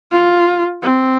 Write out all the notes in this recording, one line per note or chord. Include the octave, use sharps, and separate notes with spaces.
F4
C4